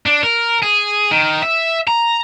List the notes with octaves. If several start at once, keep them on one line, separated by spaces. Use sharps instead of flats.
D4
A#4
G#4
D#3
E5
A#5